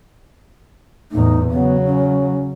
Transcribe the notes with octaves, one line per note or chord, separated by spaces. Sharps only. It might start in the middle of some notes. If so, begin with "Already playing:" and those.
E2 A2 D#4
C#3 F#3 B3
C#4